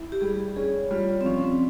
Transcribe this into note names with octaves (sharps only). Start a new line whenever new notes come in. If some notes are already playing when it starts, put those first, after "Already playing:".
Already playing: E4
G4
G3 G#4
C#4 G#4
G3 F4
C4
F3 C#4
C4